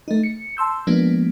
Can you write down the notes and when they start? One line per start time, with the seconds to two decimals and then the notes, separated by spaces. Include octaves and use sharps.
0.08 A3 D#4
0.23 C#7
0.57 A5 C6 E6 G6
0.87 F3 G#3 A#3 B3 D4